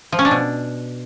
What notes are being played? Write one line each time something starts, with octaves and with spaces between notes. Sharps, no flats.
F3
C#4
D4
B2